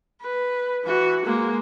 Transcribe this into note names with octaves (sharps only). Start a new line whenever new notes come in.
B4
E3 F#4
G#3 A#3